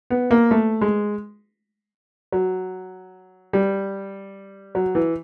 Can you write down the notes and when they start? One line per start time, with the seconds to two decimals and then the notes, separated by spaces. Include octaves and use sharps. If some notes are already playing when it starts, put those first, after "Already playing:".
0.10 B3
0.31 A#3
0.51 A3
0.81 G#3
2.32 F#3
3.53 G3
4.75 F#3
4.95 E3